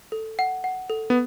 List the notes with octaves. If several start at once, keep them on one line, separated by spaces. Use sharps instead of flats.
A4
F#5
F#5
A4
B3